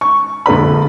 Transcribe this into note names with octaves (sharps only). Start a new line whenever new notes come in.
C#6
A#1 D3 B4 B5